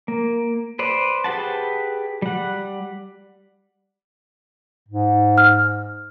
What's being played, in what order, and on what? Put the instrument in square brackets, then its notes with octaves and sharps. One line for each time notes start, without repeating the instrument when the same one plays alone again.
[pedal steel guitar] A#3
B4 C5 D5
G4 G#4 B4 F#5 A5
G3 F#5
[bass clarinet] G#2
[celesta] F6